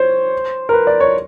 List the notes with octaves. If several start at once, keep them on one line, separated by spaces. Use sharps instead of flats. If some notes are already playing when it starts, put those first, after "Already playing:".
Already playing: C5 C#5
A#4
B4
D5
C#5